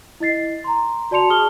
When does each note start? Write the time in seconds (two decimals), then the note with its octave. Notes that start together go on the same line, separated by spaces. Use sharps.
0.20 E4 D#5 A6 C7
0.64 A#5 C6
1.11 F#4 D5 A5 C6 C#7 F7
1.30 G#4 A5 D#6 F6 G7